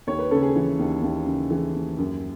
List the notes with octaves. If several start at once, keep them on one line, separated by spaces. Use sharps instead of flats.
D#2 C#5
B4
C#3 A4
G#4
E3
D#2
D#2
C#3
E3 G#4
D#2
F#2